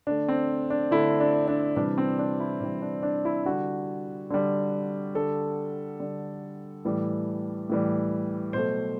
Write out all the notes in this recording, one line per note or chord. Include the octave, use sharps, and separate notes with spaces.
D3 A3 D4
C4
D4
D3 A3 E4
D4
D4
C3 E3 G3 D4
C4
D4
E4
C3 E3 G3 D4
D4
D4
E4
D3 G3 F#4
D3 G3
D3 G3 A4
D3 G3
A2 E3 G3
A2 E3 G3
B2 F#3 A3 C5